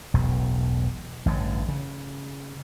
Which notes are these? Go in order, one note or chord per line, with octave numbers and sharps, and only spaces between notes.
E1 B1 A2
A1 G2 D3
C#3